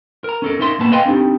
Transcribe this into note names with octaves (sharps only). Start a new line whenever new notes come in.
A#4 A#5
C#4 A4 A#4
C#4 D#4 A#4 E5 C6
A2 A#3 B3 A5
B4 D#5 F5 G5 G#5 C6
C4 D4 D#4 G4